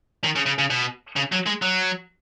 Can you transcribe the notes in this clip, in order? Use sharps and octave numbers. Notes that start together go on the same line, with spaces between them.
D#3
C#3
C#3
C#3
B2
C#3
F#3
G#3
F#3